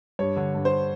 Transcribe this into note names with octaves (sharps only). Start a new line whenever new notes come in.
G2 C#5
D3
G2
C5